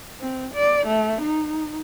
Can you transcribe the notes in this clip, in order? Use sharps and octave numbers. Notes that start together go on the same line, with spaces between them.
C4
D5
A3
D#4